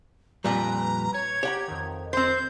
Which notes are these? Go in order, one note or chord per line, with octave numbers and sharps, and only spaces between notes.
F2 A#2 G3 B4 A#5
C#5 G#6
G4 C#5 F#5 A#5
F2 D#3
C4 C5 G6